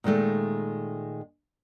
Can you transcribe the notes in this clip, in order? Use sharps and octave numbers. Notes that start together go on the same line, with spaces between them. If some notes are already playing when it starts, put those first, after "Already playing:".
A#2 D#3 G#3 A3